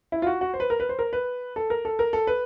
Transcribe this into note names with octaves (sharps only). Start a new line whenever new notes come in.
E4
F4
F#4
F#4
C5
B4
A#4
B4
C5
A#4
B4
A4
A#4
A4
A#4
A4
B4